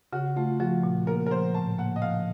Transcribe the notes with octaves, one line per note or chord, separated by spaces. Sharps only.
C#3 F#4
A3 F4
F3 F#4
A#2
A#3 A#4
A#4
F3 C5
A2 A5
A#3 F#5
D#5
F3 F5